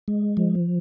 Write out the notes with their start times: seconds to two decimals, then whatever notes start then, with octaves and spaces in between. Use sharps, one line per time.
0.08 G#3
0.37 F3